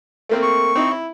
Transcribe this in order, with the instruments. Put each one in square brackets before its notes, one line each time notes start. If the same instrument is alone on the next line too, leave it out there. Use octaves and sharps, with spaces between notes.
[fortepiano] A3 A#3 C4
[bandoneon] C#6
[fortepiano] C4 D#4 E4
E4